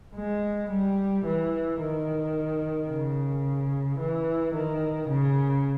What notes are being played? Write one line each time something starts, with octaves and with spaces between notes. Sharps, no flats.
G#3
G3
E3
D#3
C#3
E3
D#3
C#3